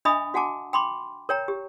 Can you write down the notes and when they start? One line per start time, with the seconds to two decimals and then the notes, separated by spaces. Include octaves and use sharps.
0.05 D4 D#5 E5 G#5 B5 D#6
0.34 F#4 F#5 G#5 A5 D6
0.73 G5 B5 C6 D6
1.29 A#4 C#5 G5 A#5
1.48 G4